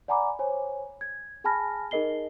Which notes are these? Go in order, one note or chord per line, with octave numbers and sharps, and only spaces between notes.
D5 F#5 G#5 A#5 B5 D6
C5 C#5 G#5
G#6
G#4 G#5 A5 B5 F6 A#6
D#4 G#4 A#4 D#5 C7 G7